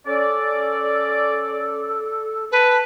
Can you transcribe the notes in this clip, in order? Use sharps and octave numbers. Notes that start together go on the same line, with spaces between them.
C#4 A4 D5
B4 A5